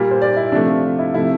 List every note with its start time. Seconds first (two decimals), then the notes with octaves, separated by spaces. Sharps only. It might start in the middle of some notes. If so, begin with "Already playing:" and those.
Already playing: A#2 G3 A#3
0.11 C5
0.22 D5
0.37 E4
0.52 C3 F3 A3 D4
0.68 F4
0.99 E4
1.14 C3 F3 A3 E4